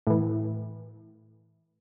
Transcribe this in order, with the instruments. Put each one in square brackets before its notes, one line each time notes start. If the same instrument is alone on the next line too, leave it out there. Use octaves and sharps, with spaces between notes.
[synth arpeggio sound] A2 E3